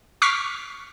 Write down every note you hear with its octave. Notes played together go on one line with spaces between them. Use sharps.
C#6 D6 F6 B6 C7